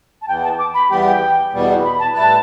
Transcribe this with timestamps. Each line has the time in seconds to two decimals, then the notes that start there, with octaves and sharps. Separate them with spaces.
0.22 A5
0.27 E2 E3 B3 G5
0.44 A5
0.58 D6
0.74 B5
0.90 E2 E3 G3 B3 G4 G5
1.05 G5
1.53 E2 B2 G3 B3
1.84 B5
1.99 A5
2.14 A2 G3 E4 B4 A5